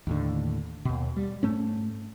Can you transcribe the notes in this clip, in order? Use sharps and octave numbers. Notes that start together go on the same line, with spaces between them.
D#2 A2 D3
D#2 B2
G3
G#2 A3 C#4